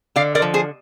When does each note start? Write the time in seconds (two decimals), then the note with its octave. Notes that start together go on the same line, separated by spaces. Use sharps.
0.16 D3 D5 F5
0.35 A#4 D5
0.42 F3
0.54 G#4 C5